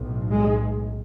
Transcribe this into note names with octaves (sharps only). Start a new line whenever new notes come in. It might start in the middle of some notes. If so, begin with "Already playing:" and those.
Already playing: B1 A2
G#3